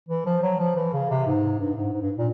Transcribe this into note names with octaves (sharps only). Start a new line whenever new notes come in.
E3
F3
F#3
F3
E3
C#3
C3
G#2
G2
G#2
G#2
G2
A#2